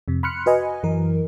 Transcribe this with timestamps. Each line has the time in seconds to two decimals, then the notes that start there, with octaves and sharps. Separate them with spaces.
0.08 F2 C3
0.23 B5 C6 F6 F#6 C#7
0.46 F#4 B4 D#5 G#5
0.83 F#2 E3 A#4